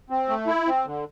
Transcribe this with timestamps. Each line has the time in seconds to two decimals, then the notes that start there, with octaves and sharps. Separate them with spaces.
0.10 C4
0.28 A3
0.47 E4
0.67 C4
0.85 D3